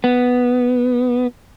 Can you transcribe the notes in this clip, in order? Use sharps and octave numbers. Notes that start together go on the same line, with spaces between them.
B3